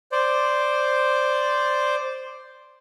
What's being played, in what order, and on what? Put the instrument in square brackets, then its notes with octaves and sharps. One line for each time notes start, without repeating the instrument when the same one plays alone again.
[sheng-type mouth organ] C5 D5